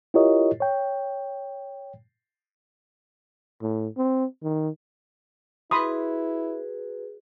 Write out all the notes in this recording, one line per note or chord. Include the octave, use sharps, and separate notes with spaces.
E4 F4 G4 A#4 C#5 D#5
C#5 G5
A2
C4
D#3
E4 F#4 G#4 B4 B5 C6 D#6